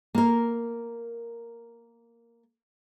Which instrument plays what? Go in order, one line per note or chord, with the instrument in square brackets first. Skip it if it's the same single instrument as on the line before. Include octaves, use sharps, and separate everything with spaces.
[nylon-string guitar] A#3 A#4